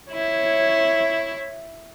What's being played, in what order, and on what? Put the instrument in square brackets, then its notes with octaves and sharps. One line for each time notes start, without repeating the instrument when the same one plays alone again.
[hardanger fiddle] E4 [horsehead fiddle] C#5